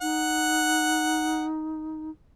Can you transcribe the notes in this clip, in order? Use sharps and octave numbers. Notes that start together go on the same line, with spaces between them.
D#4 F#5